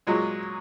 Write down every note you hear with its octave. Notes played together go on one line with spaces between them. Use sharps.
A#2 F#3 G#3